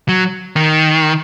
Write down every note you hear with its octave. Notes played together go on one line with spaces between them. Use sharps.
F#3
D#3